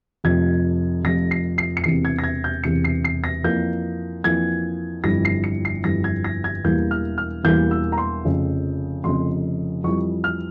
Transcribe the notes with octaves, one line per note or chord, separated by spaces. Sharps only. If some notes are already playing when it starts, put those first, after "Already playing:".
F1 F2 C3 F3 G#6
F1 F2 C3 F3 A#6
C7
C7
C#7
E1 E2 C3 C7
G#6
A#6
G#6
G6
E1 E2 C3 C#7
C7
C7
A#6
F2 E3 A#3 G6
F2 E3 A#3 G#6
G1 F2 E3 G3 A#6
C7
C#7
C7
G1 F2 E3 G3 A#6
G#6
A#6
G#6
E1 E2 E3 G3 A#3 G6
F6
F6
E1 E2 E3 G3 A#3 G6
E6
A#5
C6
F1 F2 C#3
F1 F2 C#3 C6
F2 E3 G3 C#6
F6